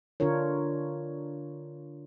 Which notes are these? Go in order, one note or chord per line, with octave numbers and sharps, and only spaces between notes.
D3 D4 F4 A#4 C#5